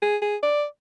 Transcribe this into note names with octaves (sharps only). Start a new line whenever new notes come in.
G#4
G#4
D5